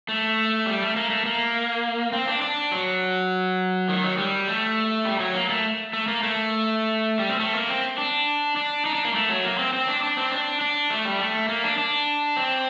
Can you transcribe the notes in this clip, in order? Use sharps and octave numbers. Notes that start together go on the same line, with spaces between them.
A3
G3
A3
A#3
A3
A#3
C4
D4
D4
F#3
D#3
F#3
G3
A3
G3
F#3
A#3
A3
A3
A#3
A3
G3
C4
A3
A#3
C4
D4
D4
D#4
D4
A#3
A3
F#3
A#3
C4
C4
D4
D4
C4
D4
D4
A3
G3
A3
A#3
D4
D4
C4